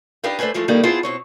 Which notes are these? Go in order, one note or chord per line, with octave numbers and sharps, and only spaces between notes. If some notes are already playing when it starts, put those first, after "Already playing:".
D4 D#4 G4 B4 D#5 F5
A3 D4 B4 C5 G#5
E3 F3 G#3 A3
D3 D#3 G3 A#3 D#4
B3 E4 F4 G#4 C5 A5
B2 C4 C#5